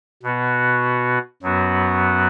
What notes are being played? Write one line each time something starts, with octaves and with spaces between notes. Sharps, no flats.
B2 B3 F#4
F#2 F#3 B3 F#4